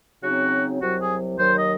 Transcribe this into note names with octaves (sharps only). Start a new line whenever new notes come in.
C#3 F#3 C4 D#4 F#4
C2 C3 F#3 F#4
G#4
D#2 D#3 F#3 C5
D#5